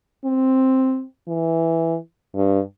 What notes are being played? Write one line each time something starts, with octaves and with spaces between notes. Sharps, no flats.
C4
E3
G2